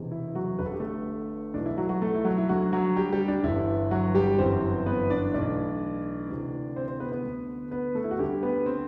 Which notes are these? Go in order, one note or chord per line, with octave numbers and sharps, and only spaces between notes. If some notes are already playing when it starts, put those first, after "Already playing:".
Already playing: E1 E2 C3
E4
F#3 F#4
G1 G2 D3 B4
A4
G4
A3 A4
B1 A2 E3 D4
E4
F#3 F#4
F#3 F#4
A3 A4
E4
F#3 F#4
E4
D2 D3 F#3 F#4
F#3 F#4
G3 G4
G3 G4
D4
G1 G2 E3 E4
F#3 F#4
G3 G4
G1 F#2 E3 C4 C5
B3 B4
D4 D5
B1 A2 E3 D4 D5
D2 C3 E3
C4 C5
C4 C5
B3 B4
B3 B4
D2 D3
B3 B4
A3 A4
E4
F#4
D2 D3 G3 G4
B3 B4
C4 C5